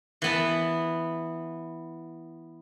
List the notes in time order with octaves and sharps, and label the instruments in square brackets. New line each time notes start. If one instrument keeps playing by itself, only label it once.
[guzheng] E3 B3 A5